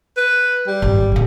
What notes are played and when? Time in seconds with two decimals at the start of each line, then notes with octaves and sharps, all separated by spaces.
0.17 B4
0.67 G3
0.82 G#1
1.12 A#2 C#3